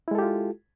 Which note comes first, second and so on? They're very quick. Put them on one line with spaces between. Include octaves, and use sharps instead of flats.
E4 G#3 A4 G4 F4